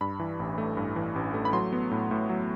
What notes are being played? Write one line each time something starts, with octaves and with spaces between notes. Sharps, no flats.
G2 B5
E3
A1
A3
G2
E3
A1
A3
B5
F#3 C6
B3
A2
A2
F#3